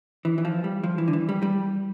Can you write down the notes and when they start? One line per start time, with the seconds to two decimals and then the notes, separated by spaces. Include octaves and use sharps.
0.25 E3
0.38 E3
0.45 F3
0.64 G3
0.84 F3
0.98 E3
1.08 D3
1.13 E3
1.29 G3
1.42 G3